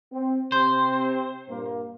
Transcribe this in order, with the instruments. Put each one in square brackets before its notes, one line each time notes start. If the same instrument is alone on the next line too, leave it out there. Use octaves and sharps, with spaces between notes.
[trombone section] C4
[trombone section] C3 C4 [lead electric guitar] C5
[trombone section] G2 A#2 A#3